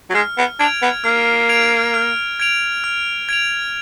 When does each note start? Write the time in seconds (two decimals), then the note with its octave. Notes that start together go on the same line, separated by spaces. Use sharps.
0.10 F#3
0.14 G#3 F6
0.38 B3
0.59 D4 G#6 D7 F7
0.82 B3
1.04 A#3 F6
1.49 G#6 D7 F7
1.94 F6
2.40 G#6 D7 F7
2.84 F6
3.29 G#6 D7 F7